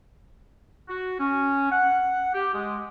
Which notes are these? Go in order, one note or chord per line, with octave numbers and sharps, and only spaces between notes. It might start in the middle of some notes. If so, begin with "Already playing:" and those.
F#4
C#4
F#5
G4
G#3